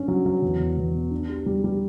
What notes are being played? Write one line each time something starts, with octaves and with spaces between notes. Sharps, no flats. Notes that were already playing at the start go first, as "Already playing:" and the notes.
Already playing: G2 C#4
F#3
F#3
E2
E2
E2
B2
D4
G4
G3
G3